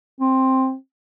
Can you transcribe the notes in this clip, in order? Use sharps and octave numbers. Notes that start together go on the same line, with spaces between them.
C4